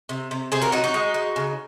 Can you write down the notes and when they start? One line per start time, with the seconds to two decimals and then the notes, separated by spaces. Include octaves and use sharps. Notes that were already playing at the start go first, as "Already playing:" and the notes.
0.09 C3
0.31 C3
0.52 C3 G#4 C5
0.62 F#4 A#4
0.72 F#3 D#4 F#4
0.84 D#4 F#4
0.94 G#3
1.14 G#3
1.36 C#3